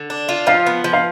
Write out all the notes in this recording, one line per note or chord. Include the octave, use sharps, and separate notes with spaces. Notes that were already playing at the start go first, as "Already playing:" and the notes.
Already playing: D3
D4
F4
F3 F5
B3
F3
F5